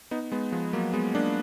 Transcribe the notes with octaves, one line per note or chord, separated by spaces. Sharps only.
B3 D#4
G#3 B3
F3 G#3
F#3 A#3
G#3 B3
A#3 D4